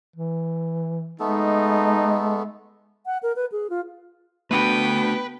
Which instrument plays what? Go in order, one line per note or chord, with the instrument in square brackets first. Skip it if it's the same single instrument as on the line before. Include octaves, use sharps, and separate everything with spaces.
[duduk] E3
[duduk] G#3 [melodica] A3 B3 A4 [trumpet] D#4
[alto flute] F#5
A#4
B4
G#4
F4
[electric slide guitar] A3 D4 F#4 [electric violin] B3 G5 [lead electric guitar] B4